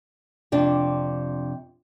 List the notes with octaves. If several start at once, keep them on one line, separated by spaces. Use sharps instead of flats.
F2 C3 D4